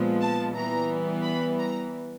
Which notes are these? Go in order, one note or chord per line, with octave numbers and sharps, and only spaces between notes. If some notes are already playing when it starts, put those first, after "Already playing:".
Already playing: A#2 F3 G#3 B3
A5
E3 G3 B3 A#5
B5
A#5